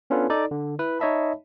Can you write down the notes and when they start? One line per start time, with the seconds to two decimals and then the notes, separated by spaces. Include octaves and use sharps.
0.10 B3 C#4 D4 F4 A4 B4
0.30 D#4 A4 D5
0.51 D3
0.79 E4 B4
0.99 D#4 C#5 D#5 E5 A5 B5